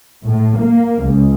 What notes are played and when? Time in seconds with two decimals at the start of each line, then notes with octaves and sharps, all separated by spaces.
0.24 A2
0.59 A#3
1.05 C#2